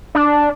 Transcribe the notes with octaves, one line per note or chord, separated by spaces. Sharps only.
D4